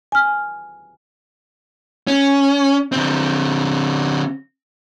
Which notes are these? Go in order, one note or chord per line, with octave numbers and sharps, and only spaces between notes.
G#5 F6
C#4
D3 C4